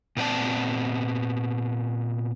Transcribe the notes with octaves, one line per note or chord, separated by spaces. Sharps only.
A#2 B3 C4 D5 A5